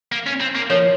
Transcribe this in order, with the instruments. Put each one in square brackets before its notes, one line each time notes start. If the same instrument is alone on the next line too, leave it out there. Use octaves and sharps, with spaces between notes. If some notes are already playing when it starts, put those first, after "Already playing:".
[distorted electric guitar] A#3
C#4
C4
A#3
[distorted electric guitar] F3 [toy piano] A#4 C#5